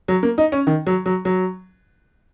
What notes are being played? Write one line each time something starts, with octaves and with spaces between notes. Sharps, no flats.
F#3
A#3
D#4
C#4
D#3
F#3
F#3
F#3